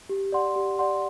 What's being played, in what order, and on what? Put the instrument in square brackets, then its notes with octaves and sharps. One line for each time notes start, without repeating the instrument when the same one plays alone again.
[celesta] G4
D5 F#5 C6
G4
D5 F#5 C6